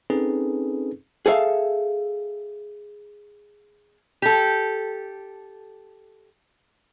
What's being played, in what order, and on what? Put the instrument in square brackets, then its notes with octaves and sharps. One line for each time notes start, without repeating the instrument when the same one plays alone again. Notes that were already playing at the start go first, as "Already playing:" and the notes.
[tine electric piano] C4 C#4 D#4 G#4 A4 B4
[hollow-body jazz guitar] G#4 A4 C#5 E5 F5
[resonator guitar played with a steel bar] G4 A4